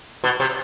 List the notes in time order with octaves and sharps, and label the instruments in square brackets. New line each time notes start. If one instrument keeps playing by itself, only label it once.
[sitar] B2
C3